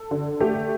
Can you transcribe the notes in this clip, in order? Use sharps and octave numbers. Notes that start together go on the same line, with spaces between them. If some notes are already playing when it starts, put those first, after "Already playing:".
Already playing: A4
D3
A3 G4